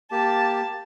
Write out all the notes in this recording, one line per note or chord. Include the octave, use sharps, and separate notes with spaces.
A#3 G4 A5